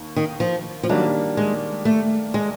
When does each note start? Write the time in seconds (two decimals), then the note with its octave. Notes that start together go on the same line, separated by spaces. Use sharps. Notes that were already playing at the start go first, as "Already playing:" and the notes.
Already playing: D#2
0.16 D#3
0.40 F3
0.83 F3
0.89 D#3 F#3 G3 A#3 D4
1.37 G#3
1.85 A3
2.34 G#3